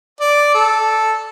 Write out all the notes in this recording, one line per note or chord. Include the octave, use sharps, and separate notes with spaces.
D5
A4